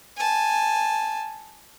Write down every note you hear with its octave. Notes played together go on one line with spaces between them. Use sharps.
G#5 A5